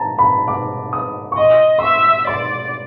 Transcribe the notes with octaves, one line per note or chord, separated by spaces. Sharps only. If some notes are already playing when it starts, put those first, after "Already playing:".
Already playing: A5 A#5
B5
D6
D#6
C#6
D#5 C6
C6
E5 C#6
D5 C6